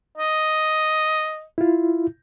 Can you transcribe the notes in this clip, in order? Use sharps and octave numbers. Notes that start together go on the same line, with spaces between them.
D#5
E4 F4